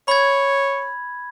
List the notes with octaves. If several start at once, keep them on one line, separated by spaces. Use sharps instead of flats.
C#5 B5 G#6